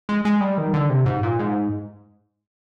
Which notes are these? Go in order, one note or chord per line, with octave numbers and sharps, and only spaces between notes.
G#3
G#3
G3
D#3
D3
C3
G#2
A#2
G#2